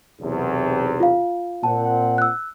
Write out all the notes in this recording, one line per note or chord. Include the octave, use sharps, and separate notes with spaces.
B1 E2 C3
F4 F5
A#2 C4 F#5 A5
E6 F#6